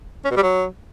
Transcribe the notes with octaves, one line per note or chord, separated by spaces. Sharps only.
C#4
B2
G3
F#3